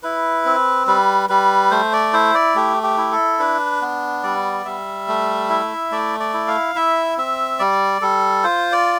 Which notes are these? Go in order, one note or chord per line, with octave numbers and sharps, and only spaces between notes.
E4 B4
C4
G3 B4
G3 B4
A3 C5
D5
E4 C5
D5
A3 G4
G4
E4
A4
D4 B4
B3
G3 D5
G3 E5
A3
E4
A3 D5
D5
E4
F5
E4 E5
C4 E5
G3 D5
G3 A4
F4 C5
D5